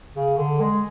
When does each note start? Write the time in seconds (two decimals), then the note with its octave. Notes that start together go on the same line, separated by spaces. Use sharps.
0.15 C#3
0.37 D3
0.60 G#3